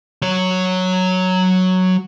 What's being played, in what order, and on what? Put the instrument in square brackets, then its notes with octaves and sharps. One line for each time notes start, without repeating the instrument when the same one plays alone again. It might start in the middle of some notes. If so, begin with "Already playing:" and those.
[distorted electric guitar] F#3 C#5